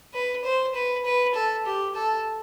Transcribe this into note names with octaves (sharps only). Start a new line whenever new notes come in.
B4
C5
B4
B4
A4
G4
A4